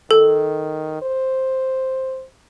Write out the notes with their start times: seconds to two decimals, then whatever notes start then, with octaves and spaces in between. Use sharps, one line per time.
0.11 D#3 A4
1.02 C5